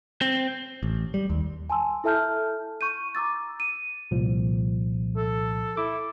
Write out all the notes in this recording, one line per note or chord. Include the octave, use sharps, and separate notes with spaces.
C4
A1
G3
D#2
G#5 A5 C6 E6
E4 A4 E5 A5 F6 G6
C#6 G6 D#7
A#5 D6 E6 A6
D#7
C2 A#2 F3
A4
E4 D6